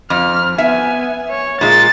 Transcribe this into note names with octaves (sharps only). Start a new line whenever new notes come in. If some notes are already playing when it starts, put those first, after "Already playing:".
F2 F6
B3 E5 G#5
C#5
A#2 G#3 A6